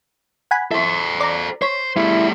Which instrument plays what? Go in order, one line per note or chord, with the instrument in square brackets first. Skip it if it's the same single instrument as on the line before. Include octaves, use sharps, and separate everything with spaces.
[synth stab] F#5 G#5 B5
[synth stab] E4 [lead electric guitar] A4 C5
[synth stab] D5 A#5
[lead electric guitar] C5 [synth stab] C#5 B6
[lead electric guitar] G3 A3 [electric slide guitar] E4